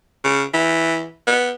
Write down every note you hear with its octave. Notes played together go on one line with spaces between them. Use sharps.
C#3
E3
B3